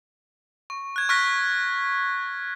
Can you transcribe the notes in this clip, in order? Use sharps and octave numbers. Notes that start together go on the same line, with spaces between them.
C#6
F#6 G#6
C#6 F6 F#6 A#6 B6